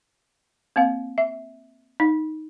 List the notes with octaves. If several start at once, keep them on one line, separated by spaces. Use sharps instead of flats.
A#3 C4 F5
E5
D#4